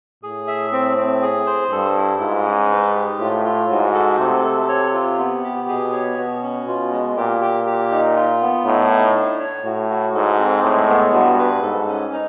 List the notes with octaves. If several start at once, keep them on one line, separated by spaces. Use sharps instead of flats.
A2 G#4
E5
C4
C4
G#4
C5
G2 A4
E4
G#2 F4
C#4
B4
G4
A2 F4
F4
G#2 F#4
A4
C3 A3
A4
C#5
F4
B3
G4
B2 G#4
C#5
B2 F#4
C#4
B2 F4
G#3
A#2 G4
G4
G4
D#4
F4
B3
A2 D#4
D#4
D4
C#5
A2 F#4
F#4
G#2 A4
C4
A2 G#3
B3
G2 F#4
B4
G#2 A4
C#4
D#4